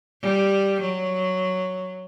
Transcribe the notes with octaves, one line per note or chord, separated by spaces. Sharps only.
G3
F#3